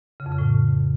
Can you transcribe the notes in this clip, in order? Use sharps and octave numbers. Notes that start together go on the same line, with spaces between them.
C#3
F2
C#3
A2